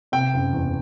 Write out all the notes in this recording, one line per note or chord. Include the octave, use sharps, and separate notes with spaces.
C3 G5
F#1
E2